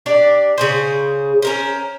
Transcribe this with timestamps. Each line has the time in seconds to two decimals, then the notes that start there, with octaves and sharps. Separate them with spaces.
0.06 D4 G4 D5
0.58 C#3 G#4 C5
1.42 C#4 A#4 C5